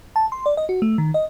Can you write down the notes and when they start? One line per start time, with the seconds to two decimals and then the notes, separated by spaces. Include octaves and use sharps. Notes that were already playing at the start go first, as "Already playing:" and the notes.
0.16 A5
0.32 C6
0.46 D5
0.57 D#5
0.69 F#4
0.82 A3
0.98 D#3
1.14 D#5